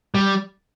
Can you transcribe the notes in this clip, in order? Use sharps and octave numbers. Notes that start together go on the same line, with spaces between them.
G3